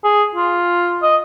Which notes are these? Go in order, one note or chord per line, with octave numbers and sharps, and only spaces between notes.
G#4
F4
D#5